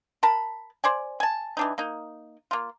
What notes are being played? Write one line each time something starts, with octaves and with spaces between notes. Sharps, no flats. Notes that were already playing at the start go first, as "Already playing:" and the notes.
A#4 A5 B5
C5 D5 G#5
G#5 A5
E3 D4 D#4
A#3 D#4
A#3 F4